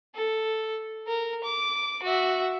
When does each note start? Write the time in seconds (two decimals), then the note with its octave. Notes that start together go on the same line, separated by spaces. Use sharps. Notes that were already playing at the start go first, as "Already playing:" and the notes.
0.15 A4
1.08 A#4
1.44 D6
2.03 F#4 E5